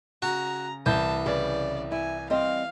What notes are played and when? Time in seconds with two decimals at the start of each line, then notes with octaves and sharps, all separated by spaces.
0.22 C#3 F#4 A#5
0.86 C2 E3 A5 G6
1.26 C#3 G#4 B4 D5
1.92 E4 G#5
2.30 G3 C4 D#5 F5